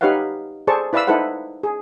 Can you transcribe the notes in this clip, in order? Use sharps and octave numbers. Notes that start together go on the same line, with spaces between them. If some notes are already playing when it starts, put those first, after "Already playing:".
D#4 G4 B4 C#5 F5 F#5
G#4 A4 C5 D5 A5 C#6
E4 B4 D5 F5 B5 E6
D#4 E4 A4 B4 C5 F#5
G#4